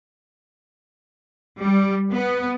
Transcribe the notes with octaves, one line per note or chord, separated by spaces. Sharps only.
G3
B3